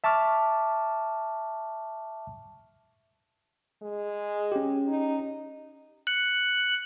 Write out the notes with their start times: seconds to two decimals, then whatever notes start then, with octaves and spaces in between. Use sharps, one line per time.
0.04 E5 A5 C#6 D6 F6
3.82 G#3
4.52 C#4 G4
4.88 D#4
6.07 F#6 C#7